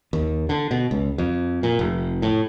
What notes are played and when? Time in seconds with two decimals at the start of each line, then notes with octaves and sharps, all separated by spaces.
0.13 D#2
0.49 D3
0.71 B2
0.91 C#2
1.18 F2
1.63 A#2
1.79 F1
2.22 A2